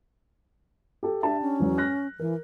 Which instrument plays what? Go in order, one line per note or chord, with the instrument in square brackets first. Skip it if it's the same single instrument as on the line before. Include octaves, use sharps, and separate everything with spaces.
[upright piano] G4 A4
[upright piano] D4 G4 A5 [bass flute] E5
[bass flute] C#4
[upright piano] E2 F#3
F6 F#6 A#6
[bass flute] E3 [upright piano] A#4